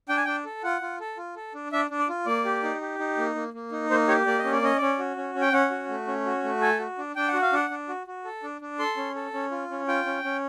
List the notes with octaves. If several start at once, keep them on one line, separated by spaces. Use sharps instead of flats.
D4 G5
G#5
D4 G5
A4
F4 F#5
F4
A4
F4
A4
D4
D4 E5
D4
D5
F4
A#3 D5
G4
D#4
G4
D#4
A#3
A#3
A#3
D#4
A#3 C5
G4 C#5
A#3 D5
D#5
C#4
D5
C#4 D#5
C#4 D5
F#4
C#4
C#4
G5
C#4 F#5
F#4
A3
C#4
F#4
A3
A4 G#5
F#4
D4
D4 G5
F#5
F#4
F5
D4 F#5
D4
F#4
F#4
A4
D4
D4
A4 C6
C#4
A4
C#4
F4
C#4
F4 G5
C#4
C#4